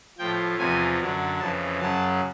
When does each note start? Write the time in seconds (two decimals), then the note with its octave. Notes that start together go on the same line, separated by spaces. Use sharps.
0.18 A2 F3 G5
0.59 E2 C3 F3 G#5
1.00 F#2 D3 F#3
1.40 F2 C#3 E3 A5
1.80 F#2 C#3 F#3 A5